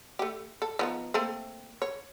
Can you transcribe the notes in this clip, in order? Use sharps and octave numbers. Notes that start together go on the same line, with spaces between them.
A3 G4
A4
F3 B3 D#4
A3 A#3 C4
C#5